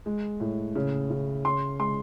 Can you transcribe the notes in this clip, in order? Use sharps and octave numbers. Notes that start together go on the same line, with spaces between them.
G#3
A2
C#3
C#3
C#3 C6
G#3 C6